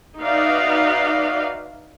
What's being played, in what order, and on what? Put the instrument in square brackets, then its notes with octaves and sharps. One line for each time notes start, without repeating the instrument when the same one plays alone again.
[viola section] D#4 F#4 B4 D5 E5 F5